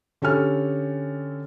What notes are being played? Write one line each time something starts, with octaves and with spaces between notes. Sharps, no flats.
D3 C#4 G4 A4 G#5 F6